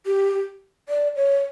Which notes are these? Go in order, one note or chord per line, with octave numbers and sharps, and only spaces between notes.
G4
D5
C#5